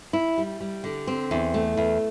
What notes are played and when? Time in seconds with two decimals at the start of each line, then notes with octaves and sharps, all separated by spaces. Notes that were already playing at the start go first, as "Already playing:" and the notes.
0.13 E4
0.38 G3
0.60 G3
0.84 D3
1.07 C4
1.31 E2
1.54 A3
1.77 E2